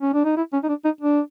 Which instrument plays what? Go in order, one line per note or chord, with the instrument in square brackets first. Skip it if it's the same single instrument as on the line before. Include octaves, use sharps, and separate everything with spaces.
[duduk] C#4
D4
D#4
E4
C#4
D#4
D4
D#4
D4